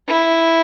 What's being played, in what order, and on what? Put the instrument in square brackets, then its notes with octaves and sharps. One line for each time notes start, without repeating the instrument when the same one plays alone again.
[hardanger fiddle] E4